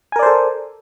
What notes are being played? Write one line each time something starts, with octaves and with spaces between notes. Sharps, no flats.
A4 A#4 C5 D5 G#5